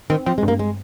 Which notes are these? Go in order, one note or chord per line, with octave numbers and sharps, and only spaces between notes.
D#3 C4
F3 C4
G#3
G2
A#3
G#3